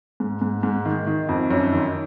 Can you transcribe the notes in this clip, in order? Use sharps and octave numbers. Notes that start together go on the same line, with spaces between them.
G#2
G#2
G#2
D#3
D#3
F2
F#2
D#3